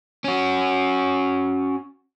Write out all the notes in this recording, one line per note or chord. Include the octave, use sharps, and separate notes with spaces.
C#4 F#4